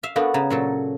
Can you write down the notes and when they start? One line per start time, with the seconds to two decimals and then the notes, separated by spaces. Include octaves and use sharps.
0.03 E5 F5
0.16 B3 D4 F#4 A4 A#4 F5
0.34 C#3 A#5
0.50 A#2 F#3 A4